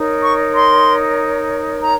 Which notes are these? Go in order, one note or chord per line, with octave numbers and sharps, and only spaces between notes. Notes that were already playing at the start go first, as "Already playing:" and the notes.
Already playing: D#4 A#4 C#5
C#6
C6
A#5